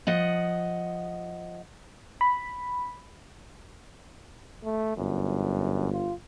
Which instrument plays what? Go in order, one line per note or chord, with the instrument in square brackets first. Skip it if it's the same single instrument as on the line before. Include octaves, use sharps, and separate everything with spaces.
[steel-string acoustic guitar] F3 D#5 F#5
[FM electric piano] B5
[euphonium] A3
[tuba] G1 [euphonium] F#2
[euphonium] F4